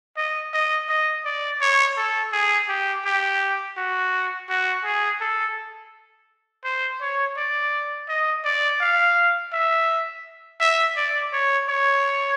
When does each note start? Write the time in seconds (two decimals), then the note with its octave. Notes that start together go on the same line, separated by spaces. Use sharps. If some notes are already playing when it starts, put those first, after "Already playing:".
0.17 D#5
0.53 D#5
0.89 D#5
1.25 D5
1.61 C#5
1.97 A4
2.33 G#4
2.69 G4
3.05 G4
3.77 F#4
4.49 F#4
4.85 G#4
5.21 A4
6.64 C5
7.01 C#5
7.37 D5
8.09 D#5
8.44 D5
8.81 F5
9.53 E5
10.61 E5
10.96 D5
11.33 C#5
11.69 C#5